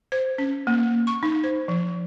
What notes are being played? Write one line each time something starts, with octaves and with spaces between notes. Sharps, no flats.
C5
C#4
A#3
C#6
D#4
C5
F3